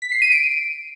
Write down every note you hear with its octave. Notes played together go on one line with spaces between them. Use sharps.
B6
C7
D#7
D7